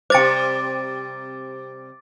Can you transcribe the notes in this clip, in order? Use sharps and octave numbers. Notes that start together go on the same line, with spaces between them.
C3 G3 C5 G5 D6 A6 D7